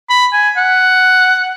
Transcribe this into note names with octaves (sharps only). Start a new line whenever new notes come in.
B5
G#5
F#5